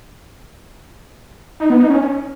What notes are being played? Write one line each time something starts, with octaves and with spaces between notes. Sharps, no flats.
D#4
B3
D#4
C#4